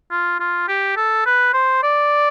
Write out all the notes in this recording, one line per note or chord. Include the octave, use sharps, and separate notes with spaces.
F4
F4
G4
A4
B4
C5
D5